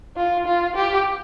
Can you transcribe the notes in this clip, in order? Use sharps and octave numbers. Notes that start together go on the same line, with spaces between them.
F4
F4
G4